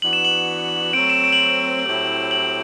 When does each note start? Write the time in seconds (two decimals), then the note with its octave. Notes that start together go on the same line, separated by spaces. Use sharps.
0.02 E3 B3 D4 F#4 F#7
0.13 E7
0.25 F#7
0.93 F#3 A3 C4 D7
1.09 E7
1.24 D7
1.33 F#7
1.40 E7
1.86 A2 F#3 C4 E4 G4
2.31 F#7